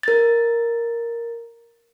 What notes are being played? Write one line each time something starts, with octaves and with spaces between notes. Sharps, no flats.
A#4 A6